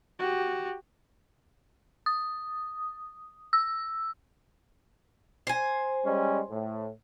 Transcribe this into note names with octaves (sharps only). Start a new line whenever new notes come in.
F#4 G4
D#6
E6
C5 G#5
G3 G#3 C#4
A2